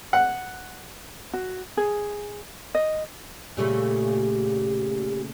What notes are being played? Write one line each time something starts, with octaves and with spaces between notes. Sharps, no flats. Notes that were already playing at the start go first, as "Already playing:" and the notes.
F#5
F#4
G#4
D#5
A#2 C#3 A3 G4